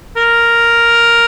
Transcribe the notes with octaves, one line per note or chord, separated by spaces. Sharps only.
A#4